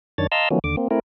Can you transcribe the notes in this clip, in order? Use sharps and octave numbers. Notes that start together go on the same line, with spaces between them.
F#2 D#3 D4 C#5 A6
D#5 F5 A5 A#5 C6 E6
D#3 F3 F#3 A3 B3 C#4
D#2 D3 D6
A#3 C4
A3 C4 E4 A#4